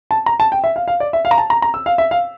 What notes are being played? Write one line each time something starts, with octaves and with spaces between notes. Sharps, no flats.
A5
A#5
A5
G5
E5
F5
F5
D5
E5
F5
A#5
A5
A#5
A#5
E6
F5
E5
F5